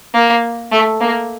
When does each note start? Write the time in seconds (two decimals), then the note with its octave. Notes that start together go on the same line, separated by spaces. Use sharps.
0.14 A#3
0.72 A3
1.01 A#3